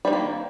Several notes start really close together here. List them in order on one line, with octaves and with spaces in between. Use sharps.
G3 F3 D#3 A#3